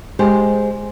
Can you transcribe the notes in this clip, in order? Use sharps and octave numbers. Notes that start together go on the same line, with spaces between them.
G#3 G4 C5